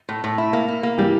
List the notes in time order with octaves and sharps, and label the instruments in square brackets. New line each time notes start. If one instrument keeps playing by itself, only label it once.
[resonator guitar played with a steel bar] A2
A2
E4
A#3
E4
A#3
[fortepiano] E3 G3 [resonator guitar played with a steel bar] G4